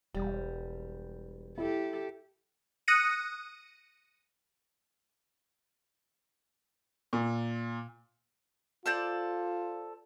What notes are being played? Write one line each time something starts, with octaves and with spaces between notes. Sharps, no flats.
E1 G3
E4 G4 A4
D#6 F#6 A#6 C#7 D#7
A#2
F4 A4 C5 D5